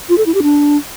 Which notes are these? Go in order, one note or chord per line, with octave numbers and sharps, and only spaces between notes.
F4
A4
E4
G4
D4